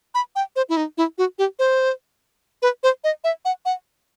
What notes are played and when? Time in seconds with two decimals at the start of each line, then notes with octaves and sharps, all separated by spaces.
0.15 B5
0.36 G5
0.56 C5
0.69 E4
0.77 D#4
0.98 E4
1.18 F#4
1.38 G4
1.59 C5
2.62 B4
2.83 C5
3.04 D#5
3.24 E5
3.45 F#5
3.65 F#5